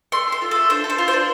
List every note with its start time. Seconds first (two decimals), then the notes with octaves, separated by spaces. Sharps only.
0.12 A3 C6
0.28 A4 C6
0.42 F4
0.51 A3 A4
0.70 D4 C5
0.84 A4
0.89 C5
0.98 F4
1.08 C5
1.13 D4